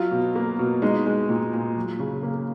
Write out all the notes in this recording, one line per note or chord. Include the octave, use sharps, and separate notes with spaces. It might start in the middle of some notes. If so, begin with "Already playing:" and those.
Already playing: F#3 F4
B2
A#3
B2
G#3 D#4
G#3
A#2
A#2
F#3
C#3
A#3